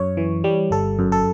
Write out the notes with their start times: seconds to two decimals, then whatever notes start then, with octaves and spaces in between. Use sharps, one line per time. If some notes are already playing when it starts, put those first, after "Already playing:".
Already playing: F#2 C#5
0.17 E3
0.44 G3
0.71 G1 A4
0.99 F#2
1.12 A4